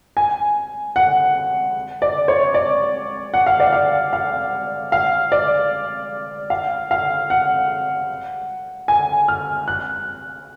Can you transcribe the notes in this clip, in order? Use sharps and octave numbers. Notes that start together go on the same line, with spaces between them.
G#5
F#5
D5
C#5
D5
F#5
F5
D5
F5
F5
F5
D5
F5
F5
F#5
G#5
F6
F#6